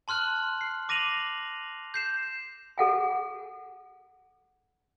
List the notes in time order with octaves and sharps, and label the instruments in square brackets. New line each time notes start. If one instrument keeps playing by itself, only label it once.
[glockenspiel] A5 C6 F6 F#6 F#7
C7
D6 A#6 D#7 F7 F#7
G6 C7 E7
[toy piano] G#4 A4 F#5 G#5